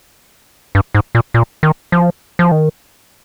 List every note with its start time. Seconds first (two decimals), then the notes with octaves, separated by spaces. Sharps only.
0.75 G2
0.95 G#2
1.15 A#2
1.34 A#2
1.63 D#3
1.92 F3
2.39 F3
2.52 D#3